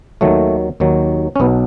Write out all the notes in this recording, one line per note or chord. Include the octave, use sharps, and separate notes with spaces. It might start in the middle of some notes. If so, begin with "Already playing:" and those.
D#2 D#3 F#3 A3
D#2 D#3 F#3
C#4
B1 B2 F#3 B3